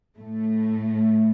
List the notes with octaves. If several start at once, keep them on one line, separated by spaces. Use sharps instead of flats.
A2 A3